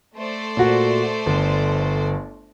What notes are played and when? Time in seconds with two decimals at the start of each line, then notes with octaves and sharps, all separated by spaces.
0.16 A3 C5 D5
0.57 A#2 F#4
1.26 G1